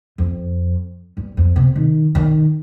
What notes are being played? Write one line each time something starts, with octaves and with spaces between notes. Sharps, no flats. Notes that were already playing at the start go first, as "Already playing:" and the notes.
F2
G2
F2
C3
D#3
D#3